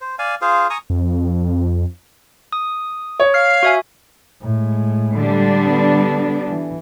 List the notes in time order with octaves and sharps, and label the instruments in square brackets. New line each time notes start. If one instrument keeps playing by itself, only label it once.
[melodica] C5
D5 F5 G#5
F4 G#4 C5 F5
G#5 A#5 C#6 D#6
[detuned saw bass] F2
[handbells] D#6
[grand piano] C#5
[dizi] F5 [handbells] F6 C7
[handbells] F#4 E5 G#5
[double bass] A2 G#3
[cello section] D3 G3 D4
[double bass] B3
E3